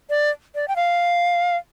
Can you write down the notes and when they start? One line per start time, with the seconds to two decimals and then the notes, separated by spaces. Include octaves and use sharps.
0.10 D5
0.55 D5
0.68 G5
0.76 F5